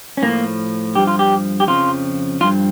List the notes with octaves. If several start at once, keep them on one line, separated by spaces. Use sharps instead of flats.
C#4
A2 F3 A#3
G2 F3 G4
F4
G4
G4
F2 C#3 F3 F4
G2 F3 F4